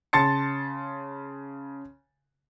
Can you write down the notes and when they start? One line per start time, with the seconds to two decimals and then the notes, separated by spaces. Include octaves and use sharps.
0.13 C#3 A5 C6 A6 C#7